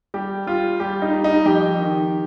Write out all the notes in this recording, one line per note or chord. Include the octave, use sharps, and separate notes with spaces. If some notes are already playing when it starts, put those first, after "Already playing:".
G3 G4
G3 F4
G3 G4
D#4
G3
D#4
F2 G4
D#3